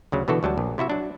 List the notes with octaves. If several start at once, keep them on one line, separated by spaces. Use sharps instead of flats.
D2 C#3 F#3
B2 D3 E3 F#4 A4
D2 F#3 G3 A5
A#1
C3 E4 F#4 E5
F#3 D4